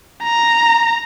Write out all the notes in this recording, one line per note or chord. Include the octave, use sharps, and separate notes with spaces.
A#5